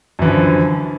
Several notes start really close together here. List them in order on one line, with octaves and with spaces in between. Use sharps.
F#2 E3 D3 F3